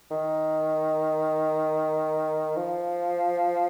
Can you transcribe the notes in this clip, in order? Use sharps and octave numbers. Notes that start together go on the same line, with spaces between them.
D#3
F3